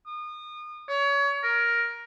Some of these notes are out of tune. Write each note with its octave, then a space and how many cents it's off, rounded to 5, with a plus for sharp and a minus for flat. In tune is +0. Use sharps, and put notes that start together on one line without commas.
D#6 -30
C#5 +30
A#4 +10